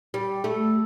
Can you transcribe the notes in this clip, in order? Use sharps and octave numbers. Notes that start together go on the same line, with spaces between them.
G3
A3